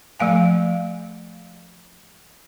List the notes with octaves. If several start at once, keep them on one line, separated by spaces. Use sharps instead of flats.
F3 A3 F5 G#5